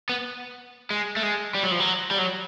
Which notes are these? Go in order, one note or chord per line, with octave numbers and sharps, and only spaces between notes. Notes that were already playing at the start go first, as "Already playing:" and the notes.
B3
G#3
A3
G#3
G3
F#3
F3
F#3
G3
F#3